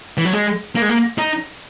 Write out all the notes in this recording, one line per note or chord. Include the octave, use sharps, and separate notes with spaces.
E3
F#3
G#3
A#3
G#3
A#3
D#4